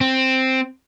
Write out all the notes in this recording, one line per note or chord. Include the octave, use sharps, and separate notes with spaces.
C4